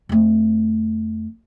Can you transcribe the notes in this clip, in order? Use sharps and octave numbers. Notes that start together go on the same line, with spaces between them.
F2 A3